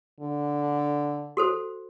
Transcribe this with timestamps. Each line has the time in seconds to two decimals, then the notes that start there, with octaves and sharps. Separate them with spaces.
0.20 D3
1.37 F#4 A4 C5